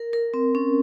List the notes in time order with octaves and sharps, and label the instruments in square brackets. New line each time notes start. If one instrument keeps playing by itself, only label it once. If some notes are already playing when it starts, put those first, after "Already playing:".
Already playing: [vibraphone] A#4
A#4
C4
C#4